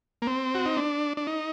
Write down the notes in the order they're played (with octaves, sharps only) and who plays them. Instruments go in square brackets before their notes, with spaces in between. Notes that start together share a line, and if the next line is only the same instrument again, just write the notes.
[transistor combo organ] A#3
C4
F#4
D#4
D4
D4
D#4